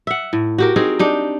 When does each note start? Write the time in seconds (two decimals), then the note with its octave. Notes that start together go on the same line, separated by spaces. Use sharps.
0.07 E5 F#5
0.33 A2
0.58 F#4 G4 A#4
0.76 C4 D#4 G#4 A#4
0.99 D4 D#4 G4